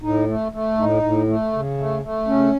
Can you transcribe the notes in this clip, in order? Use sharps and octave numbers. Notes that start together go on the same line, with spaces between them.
A2 D#4
A3
A3
A2 D#4
A2
A3
C#3
A3
A3
C#3 C#4